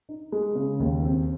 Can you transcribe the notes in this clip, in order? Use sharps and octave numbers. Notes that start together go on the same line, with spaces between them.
D#4
G#3
C#3
D#2
C4